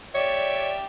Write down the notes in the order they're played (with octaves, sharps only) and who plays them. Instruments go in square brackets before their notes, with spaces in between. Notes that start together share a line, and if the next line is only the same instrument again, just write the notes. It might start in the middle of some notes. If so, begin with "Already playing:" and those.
[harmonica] G4 E5 [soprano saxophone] C#5 [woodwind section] D5